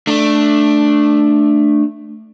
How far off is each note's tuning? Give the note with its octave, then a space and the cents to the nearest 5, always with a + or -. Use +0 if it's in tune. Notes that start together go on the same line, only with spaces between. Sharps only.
A3 +0 D4 +10